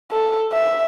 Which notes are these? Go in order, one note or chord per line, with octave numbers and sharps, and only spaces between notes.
A4
E5